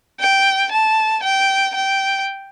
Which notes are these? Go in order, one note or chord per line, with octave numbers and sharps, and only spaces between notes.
G5
A5
G5
G5